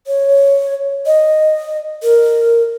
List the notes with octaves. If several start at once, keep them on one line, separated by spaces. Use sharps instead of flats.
C#5
D#5
A#4